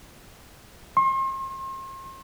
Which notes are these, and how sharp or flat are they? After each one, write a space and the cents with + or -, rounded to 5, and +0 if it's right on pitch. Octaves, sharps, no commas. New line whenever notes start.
C6 +40